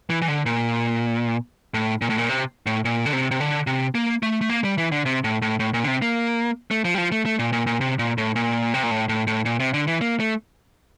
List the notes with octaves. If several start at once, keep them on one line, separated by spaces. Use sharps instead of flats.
E3
E3
D3
A#2
A2
A#2
A2
A#2
C3
A2
A#2
D3
C3
C3
D3
C3
A#3
A3
A3
A#3
G3
E3
D3
C3
A2
A2
A2
A#2
D3
C3
A#3
A3
F3
G3
F3
A3
A3
A#2
A#2
A#2
C3
A#2
A2
A#2
C3
A#2
A2
A2
A2
A#2
C3
D3
E3
A#3
A3